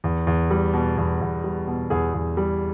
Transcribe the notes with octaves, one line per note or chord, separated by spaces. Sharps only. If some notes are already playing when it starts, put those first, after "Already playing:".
E2
E2
G3
B2
E2
E2
G3
B2
E2 G#4
E2
G3